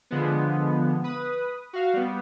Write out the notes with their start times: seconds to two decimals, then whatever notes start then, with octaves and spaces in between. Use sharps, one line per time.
0.11 D3 F3 G#3 B3
1.04 B4 D#6
1.73 F#4 F5
1.94 G3 B3